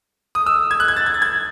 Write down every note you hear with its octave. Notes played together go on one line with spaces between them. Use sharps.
D#6
E6
G#6
F#6
G#6
A6
G#6
A6
G#6